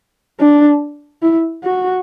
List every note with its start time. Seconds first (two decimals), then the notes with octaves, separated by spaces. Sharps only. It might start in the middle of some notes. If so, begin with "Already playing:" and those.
0.40 D4
1.23 E4
1.64 F#4